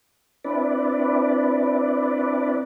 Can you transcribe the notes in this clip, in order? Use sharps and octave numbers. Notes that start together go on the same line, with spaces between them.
C4 D4 E4 B4 D5